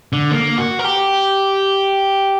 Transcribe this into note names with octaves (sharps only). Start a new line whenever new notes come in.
D3
A#3
F#4
A#4
G4